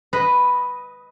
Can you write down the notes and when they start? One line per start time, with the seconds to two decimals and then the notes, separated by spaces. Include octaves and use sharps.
0.13 B4 D#5